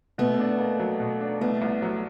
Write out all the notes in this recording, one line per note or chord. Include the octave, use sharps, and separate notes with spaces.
B2 A3 B3
D4
A#3
F#3
B2
D4
C2 A3 B3
C2
F#3